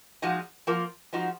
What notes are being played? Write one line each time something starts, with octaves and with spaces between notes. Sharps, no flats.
A#2 F3 G#3 D#4 F#4
F3 A#3 F4
F3 G#3 D#4 F#4